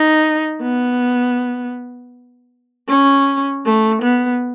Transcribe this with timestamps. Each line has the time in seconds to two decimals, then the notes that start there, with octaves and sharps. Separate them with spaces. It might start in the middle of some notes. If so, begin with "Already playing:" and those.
Already playing: D#4
0.62 B3
2.89 C#4
3.65 A3
4.03 B3